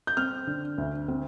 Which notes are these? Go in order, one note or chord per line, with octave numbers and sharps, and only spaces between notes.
G6
C4 F6
D3
D2
C4